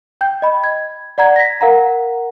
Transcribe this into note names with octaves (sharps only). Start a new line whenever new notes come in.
G5 G6
D#5 B5
G#6
D5 F#5 A#5 G#6
A#6 B6
A#4 F5 F#5 A#5